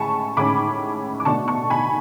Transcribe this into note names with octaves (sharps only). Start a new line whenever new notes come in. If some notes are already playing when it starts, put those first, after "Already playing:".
Already playing: A2 G#3 C#4 G#5 A5 B5 C#6
A2 G#3 C#4 B5 D6
D6
B2 A3 D4 A5 C#6
A5 C#6
G#5 B5